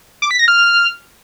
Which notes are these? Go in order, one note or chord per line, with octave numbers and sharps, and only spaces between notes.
D6
B6
A#6
F6